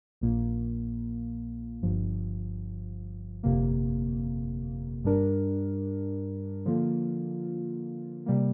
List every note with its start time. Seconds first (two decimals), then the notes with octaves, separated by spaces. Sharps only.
0.21 A#1 A#2 A#3
1.83 G1 G2 F3
3.43 G1 F2 C3 A#3
5.04 G2 G3 D4 A#4
6.66 D3 F3 A#3 F4
8.26 C3 G3 A#3